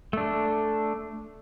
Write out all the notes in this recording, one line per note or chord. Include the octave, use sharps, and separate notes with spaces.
A3 D4